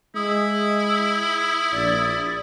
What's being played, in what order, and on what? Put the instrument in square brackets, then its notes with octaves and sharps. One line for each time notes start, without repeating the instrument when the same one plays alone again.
[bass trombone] G#3 [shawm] E4 [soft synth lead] D#6
[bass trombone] A#1 [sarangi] D5